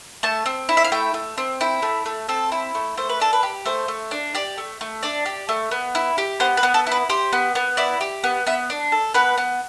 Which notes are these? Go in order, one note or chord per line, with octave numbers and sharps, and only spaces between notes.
A3 A5
C4
E4
E5
F5
A3 G5
A3
C4
E4 G5
A3
A3
C4 A4
E4
A3
A3 C5
B4
D4 A4
B4
G4
A3 C5
A3
D4
G4 D5
A3
A3
D4 D5
G4
A3
B3
E4
G4
B3 C5
B4
B3
A4
E4 B4
G4 C5
B3
B3
E4 D5
G4
B3
B3 E5
D4
A4
B3 B4
B3